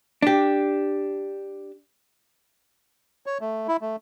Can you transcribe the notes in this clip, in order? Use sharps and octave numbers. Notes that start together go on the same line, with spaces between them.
D4 G4
C#5
A3
E4
A3